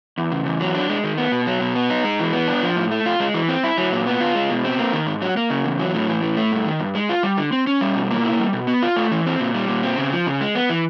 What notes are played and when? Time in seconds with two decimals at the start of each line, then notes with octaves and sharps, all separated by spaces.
0.18 E2
0.32 C#3
0.46 E2
0.61 F#3
0.75 D4
0.89 G#3
1.04 D#3
1.18 B3
1.32 B2
1.47 F#3
1.61 B2
1.76 B3
1.90 D#4
2.04 G#3
2.19 E3
2.33 B3
2.48 D4
2.63 F3
2.76 A2
2.91 A3
3.06 F4
3.20 G#3
3.34 E3
3.48 C4
3.64 E4
3.78 F#3
3.92 A#2
4.07 B3
4.20 F4
4.35 G#3
4.50 B2
4.64 C4
4.79 A#3
4.93 D#3
5.07 G#2
5.22 F#3
5.37 A#3
5.50 C#3
5.65 E2
5.79 F#3
5.94 A2
6.08 E3
6.22 A2
6.37 A3
6.51 G2
6.66 D#3
6.80 G2
6.95 G#3
7.09 F4
7.23 G3
7.38 D3
7.52 C4
7.67 C#4
7.81 G3
7.96 B2
8.11 A#3
8.24 E4
8.39 G3
8.53 B2
8.67 B3
8.83 F4
8.96 A3
9.11 E3
9.26 C4
9.39 A#2
9.55 G3
9.68 A#2
9.83 C4
9.98 C#3
10.12 F3
10.27 C#3
10.41 G#3
10.55 B3
10.69 E3